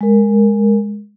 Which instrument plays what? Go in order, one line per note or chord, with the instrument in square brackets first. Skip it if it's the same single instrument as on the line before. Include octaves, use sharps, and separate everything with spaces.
[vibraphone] G#3 A#4